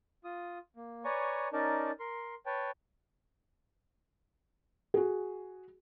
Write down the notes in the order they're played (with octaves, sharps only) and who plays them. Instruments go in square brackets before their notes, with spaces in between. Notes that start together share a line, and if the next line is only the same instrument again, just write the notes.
[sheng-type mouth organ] F4 D#6
A#3
B4 C#5 D5 G#5 A#5 C#6
C#4 D#4 A#4 D5 A5
A#4 C6
B4 C#5 G5 A5
[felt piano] F#4 G#4